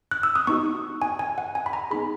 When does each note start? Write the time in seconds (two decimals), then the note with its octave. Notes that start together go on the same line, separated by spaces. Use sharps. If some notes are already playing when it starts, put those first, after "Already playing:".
0.11 F#6
0.23 E6
0.35 D#6
0.47 B3 D#4 F#4 C#6
1.02 G#5
1.19 G#5
1.38 F#5
1.55 G#5
1.66 B5
1.73 A#5
1.91 B3 D#4 G#4 B5